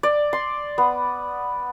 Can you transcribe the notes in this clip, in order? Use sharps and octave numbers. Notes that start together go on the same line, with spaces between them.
D5
C6
B3